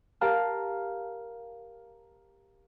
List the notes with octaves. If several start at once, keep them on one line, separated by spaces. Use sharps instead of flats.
G4 A#4 F5 A5 A#5 F6